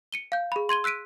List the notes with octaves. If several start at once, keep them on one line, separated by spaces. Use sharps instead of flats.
C#7 D#7 G7
F5 G6
G#4 B5
C6 G#6 D#7 G7
E6 F#6 B6 D7 D#7